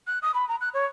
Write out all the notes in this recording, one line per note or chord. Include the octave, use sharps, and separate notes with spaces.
F#6
D#6
B5
A#5
F#6
C#5